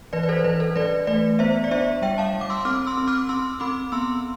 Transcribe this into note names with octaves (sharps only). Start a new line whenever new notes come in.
E3 B4 D5
B4
A4 C5
E3 B4
A4
E3 B4 D5
A3 B4 D5
B3 C5 E5
D5
D4 C5 E5
G3 E5 G5
F5 A5
G3
D6
C6 E6
C4 D6 F6
C6 E6
C4
D6 F6
C4 C6 E6
C4 B5 D6
B3 C6 E6